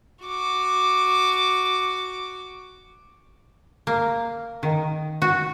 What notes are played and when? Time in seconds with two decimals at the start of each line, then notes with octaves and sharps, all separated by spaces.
0.24 F#4 D6
3.87 A#3
4.63 D#3
5.22 F#4